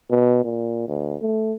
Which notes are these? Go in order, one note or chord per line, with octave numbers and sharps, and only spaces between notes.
B2
A#2
D2
A3